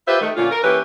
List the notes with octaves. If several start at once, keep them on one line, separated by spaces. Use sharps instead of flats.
F4 G4 B4 C5 E5
D#3 A3
A#2 D3 C#4 F4
A#4
E3 A#3 C#4 G4 B4